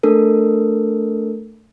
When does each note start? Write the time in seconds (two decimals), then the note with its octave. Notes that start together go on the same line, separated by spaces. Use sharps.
0.03 A3 D4 A4 A#4